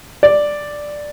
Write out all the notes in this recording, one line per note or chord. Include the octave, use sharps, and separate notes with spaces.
D5